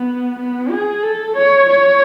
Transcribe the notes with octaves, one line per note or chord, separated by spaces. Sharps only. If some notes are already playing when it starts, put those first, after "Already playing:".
Already playing: B3
B3
G#4
A4
C#5
C#5